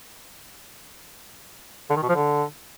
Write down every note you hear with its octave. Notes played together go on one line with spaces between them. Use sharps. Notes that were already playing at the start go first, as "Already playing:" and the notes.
D3
D#3
B2
F3
D3